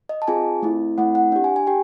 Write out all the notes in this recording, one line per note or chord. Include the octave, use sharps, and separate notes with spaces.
D#5
A5
C4 F4 G#4 G#5
A3 C4 E4
A3 C4 E4 F#5
F#5
D4 G4
G#5
G#5
G4 G5